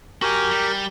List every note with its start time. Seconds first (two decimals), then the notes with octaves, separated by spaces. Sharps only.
0.22 F#4 G4 A#4 G#5
0.50 G3